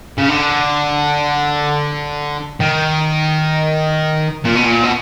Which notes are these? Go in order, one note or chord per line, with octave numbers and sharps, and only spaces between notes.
C#3
D3
D#3
A#2
B2
A#2
B2